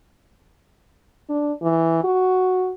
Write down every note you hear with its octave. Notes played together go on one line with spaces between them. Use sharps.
D4
E3
F#4